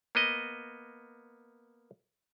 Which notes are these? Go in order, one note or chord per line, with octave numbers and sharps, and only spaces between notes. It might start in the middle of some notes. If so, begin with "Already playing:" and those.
A#3 B3 D#5